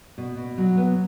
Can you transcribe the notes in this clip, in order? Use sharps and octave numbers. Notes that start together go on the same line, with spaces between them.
B2
B2
F#3
B3